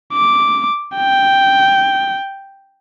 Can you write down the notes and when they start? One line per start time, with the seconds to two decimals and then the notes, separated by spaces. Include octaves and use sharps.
0.13 D6
0.96 G5